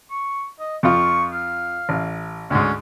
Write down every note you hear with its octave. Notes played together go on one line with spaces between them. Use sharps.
C#6
D#5
F2 F4 C#6
F5
A1
D2 G#2 C#4